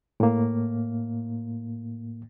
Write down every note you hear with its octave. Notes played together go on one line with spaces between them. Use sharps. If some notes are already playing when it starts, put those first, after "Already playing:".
A2 A#3